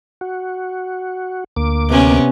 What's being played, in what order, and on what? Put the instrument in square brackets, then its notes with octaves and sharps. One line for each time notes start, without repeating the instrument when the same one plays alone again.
[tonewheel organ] F#4
D2 A#3 D6
[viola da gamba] C3 B3 C#4